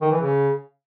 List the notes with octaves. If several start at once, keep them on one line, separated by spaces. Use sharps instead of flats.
D#3
E3
C#3